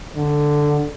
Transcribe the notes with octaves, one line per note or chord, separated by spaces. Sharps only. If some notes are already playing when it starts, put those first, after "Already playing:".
D3